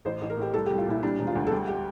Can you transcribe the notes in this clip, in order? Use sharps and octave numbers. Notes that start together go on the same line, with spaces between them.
A1 C5
A1
A#4
A2 G4
C2 A4
G4
C2
F4
A#2 E4
G3 D4
E1
F4
D2
A4
G3 G4
G4